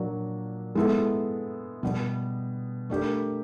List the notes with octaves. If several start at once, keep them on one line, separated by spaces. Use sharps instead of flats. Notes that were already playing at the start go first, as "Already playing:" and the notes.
Already playing: A#2 F#3 A#3 D4
G#3 B3 E4 A4
B2 G3 B3
A3 D4 G4 A#4